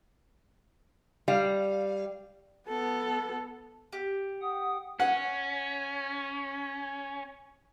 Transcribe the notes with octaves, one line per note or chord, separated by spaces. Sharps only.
G3 F5
B3 A4
G4
F#5 G5 D#6
C#4 F#5